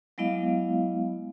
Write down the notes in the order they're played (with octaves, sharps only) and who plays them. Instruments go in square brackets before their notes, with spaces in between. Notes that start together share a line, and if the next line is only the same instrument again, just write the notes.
[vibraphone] F#3 G#3 B3 E4 D#5 F5